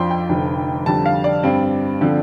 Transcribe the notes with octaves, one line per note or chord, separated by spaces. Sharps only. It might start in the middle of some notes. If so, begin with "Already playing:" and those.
Already playing: F2 F3 D4 G5 C6
G5
F1 F2 D3
F2 D3 G3 A5
F5
D5
G2 G3 C4
D3 F3 C4